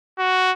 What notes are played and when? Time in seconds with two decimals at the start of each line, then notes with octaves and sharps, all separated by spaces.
0.19 F#4